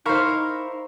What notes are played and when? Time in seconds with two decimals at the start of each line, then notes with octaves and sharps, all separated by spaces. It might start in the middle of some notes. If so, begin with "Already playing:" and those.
0.06 D#4 E4 A#4 C5 F5 C#6